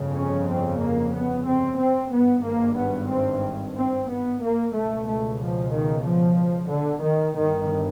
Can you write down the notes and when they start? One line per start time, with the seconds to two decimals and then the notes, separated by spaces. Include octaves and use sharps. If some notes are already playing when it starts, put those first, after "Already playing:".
Already playing: G1 F2 C#3
0.16 C#4
0.49 C4
0.81 A#3
1.14 B3
1.48 C4
1.79 C4
2.12 G#1 G2 B3
2.45 A#3
2.78 B3
3.10 C4
3.76 C4
4.09 B3
4.42 A#3
4.74 C#2 B2 A3
5.08 A3
5.40 F3
5.72 D#3
6.06 F3
6.70 D3
7.03 D#3
7.35 G1 G2 D#3